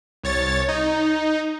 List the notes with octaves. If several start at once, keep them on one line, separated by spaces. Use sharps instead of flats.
C2 C#5 A6
D#4